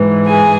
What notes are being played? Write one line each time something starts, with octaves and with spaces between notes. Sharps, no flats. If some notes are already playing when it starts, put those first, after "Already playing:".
Already playing: G#2 E3
G#4 G#5